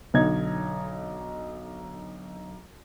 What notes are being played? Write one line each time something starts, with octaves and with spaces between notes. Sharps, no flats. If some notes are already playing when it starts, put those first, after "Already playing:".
B1 D3 D#4 G#6